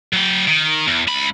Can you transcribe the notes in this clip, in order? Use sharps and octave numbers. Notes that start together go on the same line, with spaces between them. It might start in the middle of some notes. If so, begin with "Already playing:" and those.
F#3 G5
D#3
E2
C#2 B5